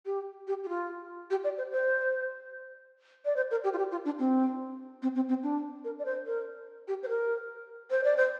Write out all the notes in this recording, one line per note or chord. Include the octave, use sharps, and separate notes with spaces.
G4
G4
G4
F4
G4
D5
C5
C5
D5
C5
A#4
G4
F4
G4
F4
D4
C4
C4
C4
C4
D4
A#4
D5
C5
A#4
G4
C5
A#4
C5
D5
C5